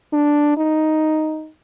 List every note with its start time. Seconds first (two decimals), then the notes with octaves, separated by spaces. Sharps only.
0.13 D4
0.57 D#4